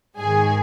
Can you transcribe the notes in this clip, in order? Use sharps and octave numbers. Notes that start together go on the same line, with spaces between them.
G#2 D#3 G#4 G#5